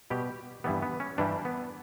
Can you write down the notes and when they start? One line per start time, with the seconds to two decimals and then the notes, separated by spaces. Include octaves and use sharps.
0.10 B2 G3 G4
0.64 G2 E3 G3 B3
0.82 B3
1.00 C#4
1.18 G2 E3 G3 D4
1.45 B3